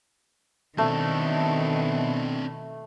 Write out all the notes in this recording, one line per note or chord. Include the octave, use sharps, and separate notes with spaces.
B2 D#3 A3 C4 D4